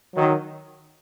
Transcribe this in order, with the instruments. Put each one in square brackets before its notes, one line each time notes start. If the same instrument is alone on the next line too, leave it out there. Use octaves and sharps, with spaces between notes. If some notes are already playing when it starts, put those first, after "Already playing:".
[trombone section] D#3 F#3